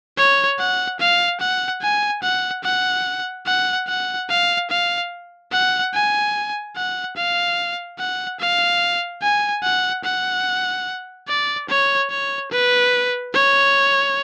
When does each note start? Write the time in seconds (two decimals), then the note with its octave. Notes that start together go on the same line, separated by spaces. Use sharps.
0.18 C#5
0.59 F#5
1.00 F5
1.40 F#5
1.82 G#5
2.23 F#5
2.64 F#5
3.46 F#5
3.88 F#5
4.29 F5
4.70 F5
5.52 F#5
5.94 G#5
6.76 F#5
7.16 F5
7.99 F#5
8.40 F5
9.22 G#5
9.63 F#5
10.04 F#5
11.28 D5
11.69 C#5
12.10 C#5
12.51 B4
13.33 C#5